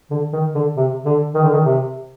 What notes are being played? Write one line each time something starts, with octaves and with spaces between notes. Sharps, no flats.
D3
D#3
D3
C3
D3
D#3
D3
D#3
C3